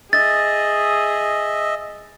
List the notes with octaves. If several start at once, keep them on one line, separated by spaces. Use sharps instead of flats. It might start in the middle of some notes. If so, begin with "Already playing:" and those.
G#4 D#5 E5 A6